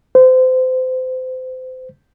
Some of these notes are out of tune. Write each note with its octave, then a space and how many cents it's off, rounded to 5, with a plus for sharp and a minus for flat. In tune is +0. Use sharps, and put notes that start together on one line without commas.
C5 -30